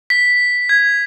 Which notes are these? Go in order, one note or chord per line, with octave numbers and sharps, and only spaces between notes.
B6
G#6